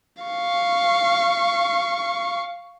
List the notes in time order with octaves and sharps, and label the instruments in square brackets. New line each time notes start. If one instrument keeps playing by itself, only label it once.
[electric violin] F5 C#6